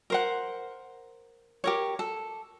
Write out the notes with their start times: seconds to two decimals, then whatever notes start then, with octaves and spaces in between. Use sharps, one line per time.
0.10 A#4 C5 F#5
1.64 G4 A#4 C#5
1.99 A4